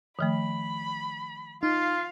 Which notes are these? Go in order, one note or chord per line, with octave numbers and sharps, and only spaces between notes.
D#3 F3 A3 B5
D#4 F4 F5